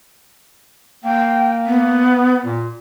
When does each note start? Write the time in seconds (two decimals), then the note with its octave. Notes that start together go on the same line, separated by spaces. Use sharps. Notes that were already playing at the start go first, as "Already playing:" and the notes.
1.05 A#3 G5
1.66 B3
2.45 A#2